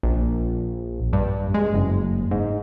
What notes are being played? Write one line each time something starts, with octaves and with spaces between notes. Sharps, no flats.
A#1
G2
G#3
F#1
G#2